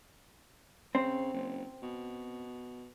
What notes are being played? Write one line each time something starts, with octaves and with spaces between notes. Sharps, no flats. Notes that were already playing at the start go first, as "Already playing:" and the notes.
C#3 C4
F#1
B2